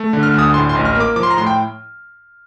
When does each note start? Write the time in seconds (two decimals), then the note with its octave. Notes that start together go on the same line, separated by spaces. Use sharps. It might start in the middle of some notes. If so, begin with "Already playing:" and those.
Already playing: A3
0.13 D3
0.23 F6
0.34 D2 D#6
0.54 A2 C6
0.69 C6
0.75 A1
0.85 F6
0.95 A#3
1.00 D6
1.16 F3 D6
1.23 C6
1.30 A#5
1.37 A2 C6
1.47 G5